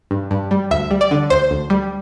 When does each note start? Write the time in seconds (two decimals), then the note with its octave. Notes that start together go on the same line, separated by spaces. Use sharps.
0.11 G2
0.31 G2
0.51 G3
0.71 D2 E5
0.91 G3
1.01 D5
1.11 D3
1.30 D2 C5
1.51 D2
1.70 G3